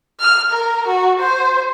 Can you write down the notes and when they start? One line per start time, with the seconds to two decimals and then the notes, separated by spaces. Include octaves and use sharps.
0.20 F6
0.51 A#4
0.87 F#4
1.19 C5